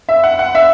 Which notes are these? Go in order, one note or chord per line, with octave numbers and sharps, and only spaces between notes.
E5
F#5
F#5
E5